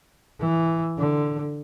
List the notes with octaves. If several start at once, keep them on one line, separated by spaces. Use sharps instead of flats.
E3
D3